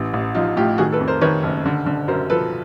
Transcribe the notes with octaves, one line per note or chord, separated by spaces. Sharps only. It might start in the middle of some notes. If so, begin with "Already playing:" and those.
Already playing: A1 E3
A1
F3 D#4 F4
A2 F4 G4
D#3 F#4 G#4
A4 B4
F2
A#4 C5
D#3 B4 C#5
F#1
D3
D3
F#2 A#4 C5
F3 A4 B4